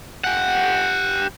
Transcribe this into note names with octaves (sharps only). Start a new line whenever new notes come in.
G4 F#5